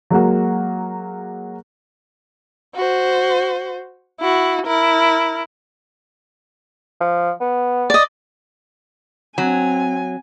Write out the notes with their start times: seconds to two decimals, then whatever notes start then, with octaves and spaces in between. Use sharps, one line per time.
0.10 F#3 G#3 A#3 F#4
2.75 F#4 C5
4.21 E4 F#4
4.67 E4 A#4
7.00 F3
7.40 B3
7.90 D5 D#5
9.38 F#3 C4 G#5